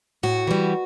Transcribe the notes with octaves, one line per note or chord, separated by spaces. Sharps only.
A2 F#4
E3 G3